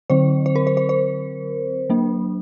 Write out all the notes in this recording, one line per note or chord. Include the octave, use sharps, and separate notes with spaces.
D3 F#3 C4 C5
C5
A#4
C5
C5
C5
F#3 A#3 D4